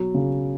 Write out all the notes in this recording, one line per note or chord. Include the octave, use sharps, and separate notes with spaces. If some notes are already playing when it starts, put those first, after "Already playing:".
Already playing: B2 F#3
C#3